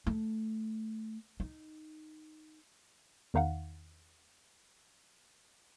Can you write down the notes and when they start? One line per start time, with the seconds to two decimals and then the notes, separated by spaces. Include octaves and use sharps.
0.07 A3
1.40 D#4
3.34 E2 D#3 D#4 F5 F#5